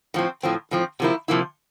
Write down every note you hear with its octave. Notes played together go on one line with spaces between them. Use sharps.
A2 F3 C4
A2 F3 C4
A2 F3 C4
C3 F3 A#3 E4
C3 F3 A#3 E4